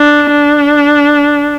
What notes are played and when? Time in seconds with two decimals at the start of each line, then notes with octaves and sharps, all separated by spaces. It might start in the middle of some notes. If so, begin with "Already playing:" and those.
Already playing: D4
0.31 D4